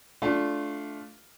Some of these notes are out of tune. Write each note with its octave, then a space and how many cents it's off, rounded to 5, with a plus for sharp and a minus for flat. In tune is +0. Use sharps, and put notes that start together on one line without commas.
A3 -15 D4 -15 F4 +0